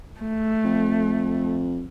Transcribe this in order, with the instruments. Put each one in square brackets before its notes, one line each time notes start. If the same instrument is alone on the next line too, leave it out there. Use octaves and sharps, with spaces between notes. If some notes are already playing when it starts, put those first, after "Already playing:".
[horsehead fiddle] A3
[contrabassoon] F2